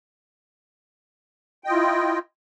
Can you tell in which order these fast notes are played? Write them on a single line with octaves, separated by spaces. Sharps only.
G5 D#5 F4 E4